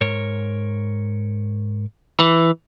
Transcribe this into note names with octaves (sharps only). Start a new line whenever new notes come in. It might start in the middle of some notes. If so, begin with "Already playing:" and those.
G#2 A#4 C#5
E3